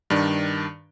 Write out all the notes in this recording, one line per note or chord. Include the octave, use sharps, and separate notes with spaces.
G2 D#3 D4